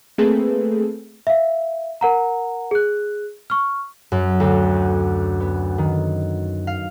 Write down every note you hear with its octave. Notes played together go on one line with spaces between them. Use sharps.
A3 A#3 C4 G#4 A4 B4
E5 F5
A#4 F#5 A#5
G#4 F#6
C#6 F6
F#2
D2
B3
D#3
F5